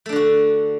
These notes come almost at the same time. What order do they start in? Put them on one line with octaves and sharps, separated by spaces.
A3 D4 D3 F#4